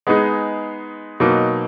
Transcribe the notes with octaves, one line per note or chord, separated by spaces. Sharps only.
G#3 B3 D#4 G#4
B2 F#3 A#3 D#4